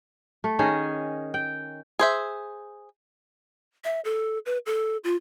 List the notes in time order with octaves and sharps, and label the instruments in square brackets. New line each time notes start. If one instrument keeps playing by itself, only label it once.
[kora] A3
D#3 C#4 G#4 D#5
G5
[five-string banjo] G#4 C5 E5
[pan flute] E5
A4
B4
A4
F4